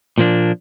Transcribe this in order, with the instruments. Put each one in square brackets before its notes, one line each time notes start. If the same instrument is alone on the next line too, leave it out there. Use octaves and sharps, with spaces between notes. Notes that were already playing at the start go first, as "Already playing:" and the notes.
[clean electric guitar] A#2 F3 A#3 D4